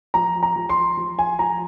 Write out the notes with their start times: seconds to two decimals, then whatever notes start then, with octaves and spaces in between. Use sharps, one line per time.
0.14 F3 A#5
0.43 A#5
0.56 F3
0.69 C6
0.97 F3
1.19 G#5
1.39 F3 A#5